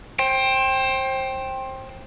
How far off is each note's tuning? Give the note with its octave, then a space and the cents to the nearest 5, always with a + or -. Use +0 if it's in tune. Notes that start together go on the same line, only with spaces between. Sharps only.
C5 +25 G5 +0